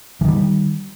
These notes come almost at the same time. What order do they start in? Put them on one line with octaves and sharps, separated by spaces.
E3 D#3 G3